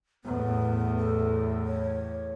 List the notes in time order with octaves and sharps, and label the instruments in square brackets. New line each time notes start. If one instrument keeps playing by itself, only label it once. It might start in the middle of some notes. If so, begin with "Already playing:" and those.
[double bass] E2 A2 [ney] B3
[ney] A4
C#5